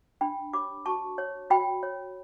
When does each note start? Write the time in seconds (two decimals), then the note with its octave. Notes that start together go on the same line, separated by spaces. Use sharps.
0.21 D4 G5 B5
0.53 G4 C#5 B5 D6
0.86 F#4 A5 C#6
1.18 C#5
1.50 F#4 G5 B5
1.83 C#5